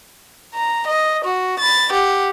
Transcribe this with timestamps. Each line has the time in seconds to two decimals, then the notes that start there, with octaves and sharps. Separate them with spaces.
0.54 A#5
0.87 D#5
1.24 F#4
1.59 B5 A6
1.92 G4 F#5